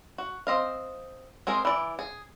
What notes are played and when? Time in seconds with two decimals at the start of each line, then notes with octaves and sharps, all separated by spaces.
0.18 F#4
0.47 C4 D#5 F5
1.47 G#3 C4 G#4 A#4
1.65 E3 D5
1.99 G#4